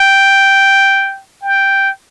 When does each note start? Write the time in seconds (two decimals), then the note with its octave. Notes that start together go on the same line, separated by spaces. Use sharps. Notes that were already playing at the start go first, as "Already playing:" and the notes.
Already playing: G5
1.42 G5